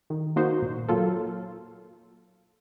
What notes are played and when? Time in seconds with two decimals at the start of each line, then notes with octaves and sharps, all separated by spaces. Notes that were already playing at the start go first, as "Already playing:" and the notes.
0.10 D#3
0.36 A#3 D#4 F#4 C5
0.62 A#2
0.89 F#3 A#3 F4 A4